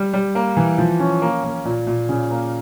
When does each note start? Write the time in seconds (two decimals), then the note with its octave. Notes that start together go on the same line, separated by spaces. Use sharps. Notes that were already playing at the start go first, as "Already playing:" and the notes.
Already playing: G3
0.13 G3
0.35 A#3
0.57 E3
0.78 F3
0.99 C#4
1.22 A#3
1.44 A#3
1.65 A#2
1.87 A#2
2.09 C#3
2.31 A#3